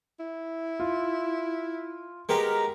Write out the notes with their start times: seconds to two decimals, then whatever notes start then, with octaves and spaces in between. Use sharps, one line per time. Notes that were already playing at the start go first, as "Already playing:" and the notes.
0.20 E4
0.80 F4
2.29 G#3 B3 G4 A#4